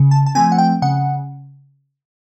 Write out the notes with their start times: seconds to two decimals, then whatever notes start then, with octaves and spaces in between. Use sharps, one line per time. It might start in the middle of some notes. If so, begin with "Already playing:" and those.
Already playing: C#3
0.11 A5
0.26 A5
0.35 F3 A3 C4 G#5
0.52 F#5
0.58 G5
0.82 C#3 F#5